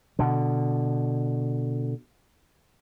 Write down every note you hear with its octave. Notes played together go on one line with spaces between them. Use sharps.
B2 D3